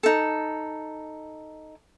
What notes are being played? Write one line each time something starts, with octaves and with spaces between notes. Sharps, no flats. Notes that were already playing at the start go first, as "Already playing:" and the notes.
D#4 A4